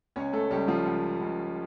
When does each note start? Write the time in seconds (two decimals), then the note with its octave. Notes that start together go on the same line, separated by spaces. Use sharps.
0.16 C#2 C#4 C#5
0.33 A3 A4
0.51 C#2 G3 G4
0.68 F3 F4
0.86 C#2
1.21 C#2